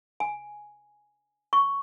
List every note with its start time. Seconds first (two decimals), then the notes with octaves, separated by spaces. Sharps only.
0.20 G#5
1.53 C#6